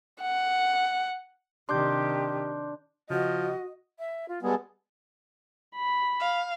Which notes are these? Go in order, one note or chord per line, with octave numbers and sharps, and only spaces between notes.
F#5
C3 D#3 D4 G4 C6 D6 G6
C#3 F3 F#4 D#5
E5
F4
G3 G#3 B3 G#4 A4
B5
F5